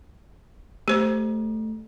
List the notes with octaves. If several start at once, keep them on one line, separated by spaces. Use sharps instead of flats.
A3 G4 C5